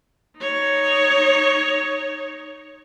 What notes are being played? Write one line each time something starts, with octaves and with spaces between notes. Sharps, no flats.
D#4 C#5